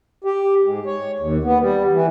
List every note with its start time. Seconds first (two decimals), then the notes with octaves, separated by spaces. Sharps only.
0.24 G4
0.63 G#2
0.86 C#5
1.20 D#2
1.44 B3
1.60 G3
1.93 E3